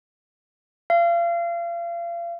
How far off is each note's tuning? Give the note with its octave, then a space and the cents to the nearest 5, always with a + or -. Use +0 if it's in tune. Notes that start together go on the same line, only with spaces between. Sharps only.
F5 -35